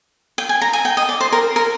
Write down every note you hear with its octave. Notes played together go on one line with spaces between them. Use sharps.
G5
G#5
A#5
G#5
G5
D#5
D5
C5
A#4
A#4